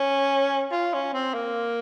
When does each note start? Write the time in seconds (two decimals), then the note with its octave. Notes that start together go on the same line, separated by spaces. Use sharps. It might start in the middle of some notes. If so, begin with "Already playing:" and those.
Already playing: C#4
0.72 F4
0.93 C#4
1.14 C4
1.34 A#3